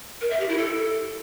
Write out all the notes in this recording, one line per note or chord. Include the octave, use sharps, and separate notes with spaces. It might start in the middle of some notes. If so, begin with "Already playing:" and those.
A#4
E5
G4
E4
A4